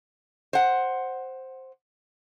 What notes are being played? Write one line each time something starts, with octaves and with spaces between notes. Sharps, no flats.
C5 F#5